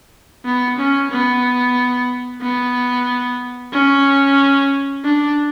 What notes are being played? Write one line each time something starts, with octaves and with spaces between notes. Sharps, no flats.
B3
C#4
B3
B3
C#4
D4